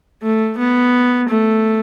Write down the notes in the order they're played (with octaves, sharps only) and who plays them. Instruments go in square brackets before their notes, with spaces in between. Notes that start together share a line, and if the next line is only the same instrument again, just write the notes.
[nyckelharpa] A3
B3
A3